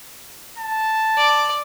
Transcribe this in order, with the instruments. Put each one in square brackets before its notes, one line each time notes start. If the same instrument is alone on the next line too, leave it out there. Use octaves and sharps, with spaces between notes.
[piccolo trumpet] A5
[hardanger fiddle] D5